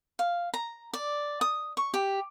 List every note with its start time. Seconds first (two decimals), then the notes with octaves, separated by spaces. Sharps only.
0.19 F5
0.54 A#5
0.93 D5
1.41 D#6
1.77 C#6
1.94 G4